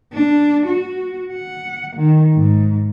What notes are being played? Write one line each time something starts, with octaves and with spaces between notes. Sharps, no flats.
D4
F#4
F#5
D#3
G#2